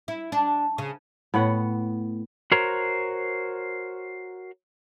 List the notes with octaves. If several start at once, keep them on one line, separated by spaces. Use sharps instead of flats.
E4
D4
C#3
A2 B3 F#5
F#4 A#4 C5 C#5 A#5